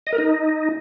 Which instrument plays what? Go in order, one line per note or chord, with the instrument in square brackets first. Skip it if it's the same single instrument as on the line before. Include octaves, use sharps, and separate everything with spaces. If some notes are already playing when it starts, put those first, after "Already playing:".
[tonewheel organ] D#5
A#4
D#4